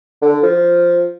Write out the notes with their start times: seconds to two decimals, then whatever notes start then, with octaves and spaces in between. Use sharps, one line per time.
0.22 D3
0.43 F3